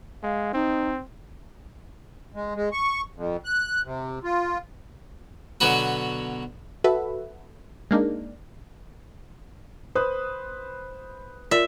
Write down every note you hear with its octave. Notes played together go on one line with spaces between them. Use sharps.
G#3 F5
C4 D#4
G#3
G#3
C#6
F2
F#6
C3
F4
B2 D3 F#3 B3 F#4 B4
F#4 A4 B4 E5
G#3 A#3 D4 D#4
B4 C5 D#6 F#6
F4 A#4 D5 E5